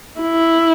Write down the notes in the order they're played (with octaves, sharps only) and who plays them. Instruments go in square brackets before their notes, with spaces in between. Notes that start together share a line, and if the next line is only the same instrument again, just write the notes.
[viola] E4